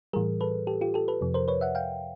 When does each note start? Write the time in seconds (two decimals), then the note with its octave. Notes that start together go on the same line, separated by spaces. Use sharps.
0.13 A2 E3 G3 G#4 A#4
0.41 A4 B4
0.67 G4 A4
0.81 F4 G4
0.94 G4 A4
1.08 A4 B4
1.21 F2 C3 F3
1.34 A#4 C5
1.48 B4 C#5
1.61 E5 F#5
1.75 F5 G5